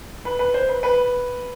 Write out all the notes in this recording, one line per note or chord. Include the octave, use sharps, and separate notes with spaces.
B4
B4
C5
B4
B4